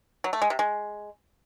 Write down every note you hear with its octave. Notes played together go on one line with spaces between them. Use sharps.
F#3
A3
G#3
C3
G#3